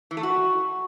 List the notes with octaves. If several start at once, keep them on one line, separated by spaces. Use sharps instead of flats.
E3
A3
F#4